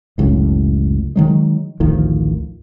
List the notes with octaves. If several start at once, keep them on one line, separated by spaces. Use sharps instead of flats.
F1 C#2 F#2 A2
D#3 F#3 G#3
A1 D2 D#3 F3